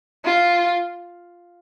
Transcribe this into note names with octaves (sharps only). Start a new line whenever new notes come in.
F4